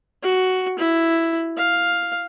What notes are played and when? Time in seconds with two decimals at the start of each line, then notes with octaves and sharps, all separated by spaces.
0.23 F#4
0.78 E4
1.57 F5